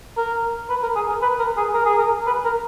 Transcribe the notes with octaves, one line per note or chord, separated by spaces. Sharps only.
A#4
B4
A#4
G#4
A#4
B4
A#4
G#4
A#4
G#4
A#4
B4
A#4